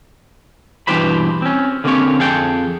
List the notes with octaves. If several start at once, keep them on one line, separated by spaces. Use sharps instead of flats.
G2 B2 E3 G4 C5 B5
C4 C#4
D3 A#3 C4 C#4 G4 C#5
F2 G#4 A4 G5